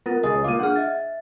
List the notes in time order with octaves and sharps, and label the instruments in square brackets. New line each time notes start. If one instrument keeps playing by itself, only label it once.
[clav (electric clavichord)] B3 [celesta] F4 A#4 A6
[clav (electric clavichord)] C#2 G#4 D#5 [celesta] D#6 A6
[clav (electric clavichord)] A#3 F4 [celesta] D6 D#7
[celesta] D4 G#4 F6 [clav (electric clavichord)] F#5
[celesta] D#5 E5 A6